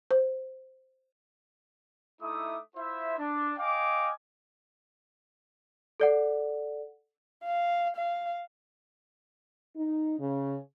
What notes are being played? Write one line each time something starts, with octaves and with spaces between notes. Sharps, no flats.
C5
A3 D#4 E4 E5 D6 D#6
E4 F4 C5 E5
D4
D#5 F5 G5 G#5 D6
A4 D5 F#5
F5
F5
D#4
C#3